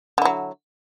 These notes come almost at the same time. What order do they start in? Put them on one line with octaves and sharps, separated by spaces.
D3 E4 F#3